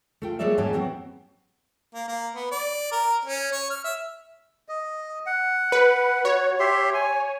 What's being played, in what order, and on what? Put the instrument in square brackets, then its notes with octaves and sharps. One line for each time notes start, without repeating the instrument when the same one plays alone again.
[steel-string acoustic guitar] A3 F4 G5
G3 G#3 A#3 C#5 D5 E5
D#2 G#2 F#3 C#4 G4 A5
F#3 B3 C4 F#4
[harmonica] A#3
A#3
B3
D5
A#4
C#4
C#5
F6
E5
[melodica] D#5
F#5
[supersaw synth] B4
[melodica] F#4 [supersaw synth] C#5
[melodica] G4 E5 C6
G#5